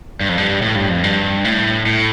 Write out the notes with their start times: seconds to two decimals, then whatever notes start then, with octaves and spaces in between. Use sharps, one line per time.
0.21 G2
0.29 F2
0.38 G2
0.62 A2
0.76 G2
0.89 F2
1.04 G2
1.44 A2
1.86 A2